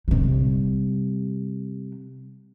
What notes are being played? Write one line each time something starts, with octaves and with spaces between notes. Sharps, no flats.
C3 G3